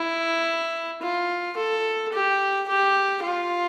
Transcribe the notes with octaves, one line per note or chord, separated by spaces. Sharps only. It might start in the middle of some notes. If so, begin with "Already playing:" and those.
Already playing: E4
F4
A4
G4
G4
F4